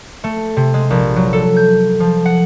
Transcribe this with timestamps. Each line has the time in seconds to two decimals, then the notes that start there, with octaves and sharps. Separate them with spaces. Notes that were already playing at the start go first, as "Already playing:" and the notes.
0.24 A3
0.57 C3
0.74 G#3
0.90 A#1
1.16 F#3
1.33 A4
1.56 G6
2.00 F3
2.26 F#5